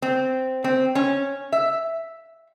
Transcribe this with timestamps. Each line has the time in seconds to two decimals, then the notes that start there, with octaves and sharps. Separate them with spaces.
0.02 C4
0.64 C4
0.95 C#4
1.52 E5